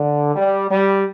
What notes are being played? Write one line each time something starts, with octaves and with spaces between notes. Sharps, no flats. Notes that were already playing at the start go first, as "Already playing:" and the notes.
Already playing: D3
G3
G3